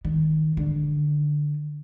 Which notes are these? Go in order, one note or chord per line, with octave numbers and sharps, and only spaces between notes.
D#3
D3